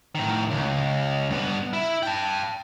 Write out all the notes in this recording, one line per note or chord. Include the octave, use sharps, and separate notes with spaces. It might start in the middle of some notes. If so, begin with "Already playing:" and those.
A2 D#3
C#2
G2 B3
E4
G5 A5